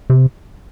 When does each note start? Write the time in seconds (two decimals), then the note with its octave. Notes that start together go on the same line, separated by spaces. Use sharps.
0.10 C3